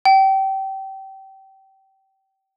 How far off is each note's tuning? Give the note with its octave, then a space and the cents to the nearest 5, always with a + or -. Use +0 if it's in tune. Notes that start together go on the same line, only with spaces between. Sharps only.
G5 -25